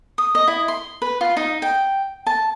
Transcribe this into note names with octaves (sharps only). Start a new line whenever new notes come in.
D#6
D#5
E4
C6
B4
F4
D#4
G5
A5